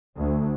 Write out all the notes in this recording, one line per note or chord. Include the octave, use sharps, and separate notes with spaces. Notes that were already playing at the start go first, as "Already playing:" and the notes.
D2